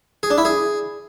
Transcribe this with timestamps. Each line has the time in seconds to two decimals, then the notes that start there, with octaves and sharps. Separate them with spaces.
0.23 G#4
0.30 D4
0.38 E4
0.45 G#4